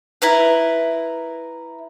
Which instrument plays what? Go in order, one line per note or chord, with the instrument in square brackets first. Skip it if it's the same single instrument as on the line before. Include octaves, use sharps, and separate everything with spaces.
[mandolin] E4 A#4 B4